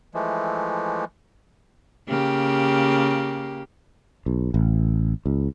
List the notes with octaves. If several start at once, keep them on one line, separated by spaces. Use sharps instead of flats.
E3 F3 G#3 A3
C#3 A#3 G4
B1
A1
C#2